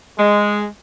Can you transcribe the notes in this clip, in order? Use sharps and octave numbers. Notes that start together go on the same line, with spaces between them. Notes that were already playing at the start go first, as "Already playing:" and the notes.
G#3